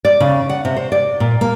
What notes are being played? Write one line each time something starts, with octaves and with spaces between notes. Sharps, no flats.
D5
C#3
F#5
C3
C5
D5
A#2
A#3